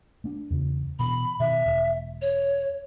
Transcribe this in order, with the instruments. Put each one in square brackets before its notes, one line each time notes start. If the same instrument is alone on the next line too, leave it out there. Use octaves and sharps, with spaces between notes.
[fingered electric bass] A3 D4
E2 C#3
[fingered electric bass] B2 E3 [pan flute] B5
[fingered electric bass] B2 D#3 [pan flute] E5
[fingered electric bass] E1
[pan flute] C#5